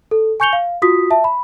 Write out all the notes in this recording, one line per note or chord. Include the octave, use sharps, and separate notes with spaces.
A4
G#5 C#6 G6 C#7 F7 G7
F5
F4 F#4 D#6 B6
E5 A5
B5